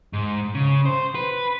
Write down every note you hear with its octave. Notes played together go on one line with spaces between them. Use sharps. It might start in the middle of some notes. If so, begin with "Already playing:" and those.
G#2
C#3
C5
B4